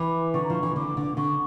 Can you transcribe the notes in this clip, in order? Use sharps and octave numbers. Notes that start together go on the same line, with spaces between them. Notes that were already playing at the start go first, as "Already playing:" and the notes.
Already playing: E3 D6
D3 C#6
A#5
F3 C#6
E3
D3 D6
D3
D3 C#6